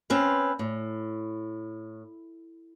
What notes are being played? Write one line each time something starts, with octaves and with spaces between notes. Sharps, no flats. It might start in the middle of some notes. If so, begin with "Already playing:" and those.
C4 C#4 B4 F5
A2